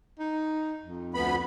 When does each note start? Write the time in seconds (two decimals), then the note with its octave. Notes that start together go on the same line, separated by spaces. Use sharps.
0.19 D#4
0.83 F2
1.14 D2 B3 B5